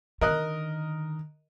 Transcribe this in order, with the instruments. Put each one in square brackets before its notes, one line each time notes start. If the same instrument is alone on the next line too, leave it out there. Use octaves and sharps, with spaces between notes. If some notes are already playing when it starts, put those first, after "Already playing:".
[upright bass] D3 D#3 [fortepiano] A#4 D#5 F#6